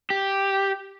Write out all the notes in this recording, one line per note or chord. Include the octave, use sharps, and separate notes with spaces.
G4